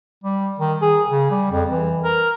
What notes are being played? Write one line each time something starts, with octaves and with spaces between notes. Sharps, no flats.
G3
D#3
G#4
C#3
G3
F2
E3
A#4